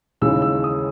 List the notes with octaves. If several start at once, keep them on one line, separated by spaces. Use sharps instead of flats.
D#2 C#3 E3 G#3 E6
E6
D#6